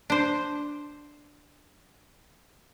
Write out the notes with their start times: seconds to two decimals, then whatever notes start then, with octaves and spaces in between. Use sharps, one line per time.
0.10 D4 C5